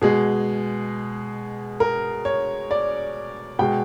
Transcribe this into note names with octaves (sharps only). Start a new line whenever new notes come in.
B2 G#3 G#4
A#4
C#5
D5
B2 G#3 G5